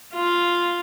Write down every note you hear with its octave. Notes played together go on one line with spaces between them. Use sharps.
F4